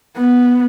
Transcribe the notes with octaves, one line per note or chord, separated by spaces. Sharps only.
B3